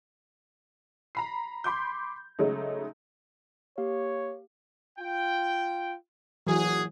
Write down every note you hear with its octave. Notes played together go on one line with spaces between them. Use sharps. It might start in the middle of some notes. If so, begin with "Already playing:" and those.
A#5 B5 C7
B5 C6 D6 G6
C#3 F#3 G#3 A3 D#4
A#3 G4 C#5 F5
F4 G5
A#2 E3 F#3 F#4 G#4